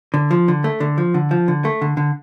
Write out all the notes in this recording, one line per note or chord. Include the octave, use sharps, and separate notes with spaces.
D3
F3
D3
A3
D3
F3
D3
F3
D3
A3
D3
D3